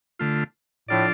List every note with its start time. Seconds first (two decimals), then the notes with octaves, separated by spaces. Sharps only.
0.19 D3 A3 F4
0.88 A2 F3 D4 F4 A4 D5